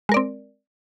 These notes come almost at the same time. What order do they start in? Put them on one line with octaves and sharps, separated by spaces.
G#3 A#4 D5 C4